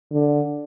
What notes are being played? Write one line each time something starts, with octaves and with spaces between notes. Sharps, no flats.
D3